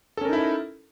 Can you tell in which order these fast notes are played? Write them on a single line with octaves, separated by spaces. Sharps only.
A4 C#4 A#4 D#4 E4